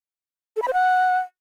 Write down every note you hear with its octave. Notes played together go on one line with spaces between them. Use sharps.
A4
B5
C5
F#5